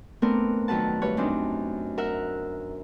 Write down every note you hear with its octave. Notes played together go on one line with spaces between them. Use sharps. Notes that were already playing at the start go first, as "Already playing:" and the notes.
A3 B3 C4 D4 A#4
F2 D#3 F#3 B4 F#5 A5
G2 B4 C#5
F#2 C4 D4 D#4
A#4 E5 F#5